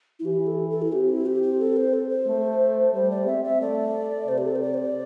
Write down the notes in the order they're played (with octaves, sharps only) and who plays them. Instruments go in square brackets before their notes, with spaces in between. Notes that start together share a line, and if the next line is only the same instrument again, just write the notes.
[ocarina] E4
[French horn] E3 [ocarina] G4
[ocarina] A4
A4
E4
[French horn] C4 [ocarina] G4
[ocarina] E4
G4
G4
A4
C5
A4
C5
[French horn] A3
[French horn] G3 [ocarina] C5
[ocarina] D5
[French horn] C4 [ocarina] E5
[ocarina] E5
[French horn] A3 [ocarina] D5
[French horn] C3 [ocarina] C5
[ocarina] G4
A4
C5
D5
C5
D5